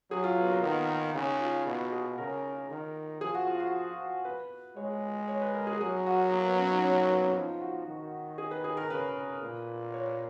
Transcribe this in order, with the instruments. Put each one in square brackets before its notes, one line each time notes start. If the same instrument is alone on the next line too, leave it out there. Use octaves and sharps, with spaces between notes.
[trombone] F#3 [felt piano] G#4
[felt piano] F4
B3
A#3
[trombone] D#3 [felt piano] B3
[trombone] C#3 [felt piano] D#4
[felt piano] F4
[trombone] B2 [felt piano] F#4
[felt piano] G#4
[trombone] C#3 [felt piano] A#4
[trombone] D#3
[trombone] F3 [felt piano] G#4
[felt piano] F#4
F4
F#4
B4
[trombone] G#3 [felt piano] C#5
[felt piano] C#5
B4
A#4
G#4
[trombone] F#3 [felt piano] G#4
[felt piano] F#4
A#3
B3
C#4
D#4
C#4
A#3
B3
C#4
[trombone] F3 [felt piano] D#4
[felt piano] F#4
[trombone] D#3
[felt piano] G#4
B4
G#4
A#4
[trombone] C#3 [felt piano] B4
[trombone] A#2
[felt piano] C#5